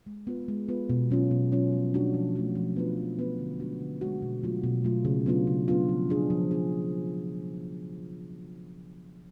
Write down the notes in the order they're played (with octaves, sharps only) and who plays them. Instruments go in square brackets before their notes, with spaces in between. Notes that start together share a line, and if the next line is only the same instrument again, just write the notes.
[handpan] G#3
B3 F4 B4
G#3
B3 F4 B4
B2
F#3 C#4 F4
B2
F#3 C#4 F4
F3
A3 D4 F#4
F3
A3 D4 F#4
F3
B3 D4 F4 B4
F3
B3 D4 F4 B4
D3
G#3 D4 F#4
D3
G#3 D4 F#4
B2
F#3 A3 F4
B2
F#3 A3 F4
C#3
F#3 B3 D4 F4
C#3
F#3 B3 D4 F4
F3
B3 D4 G#4
F3
B3 D4 G#4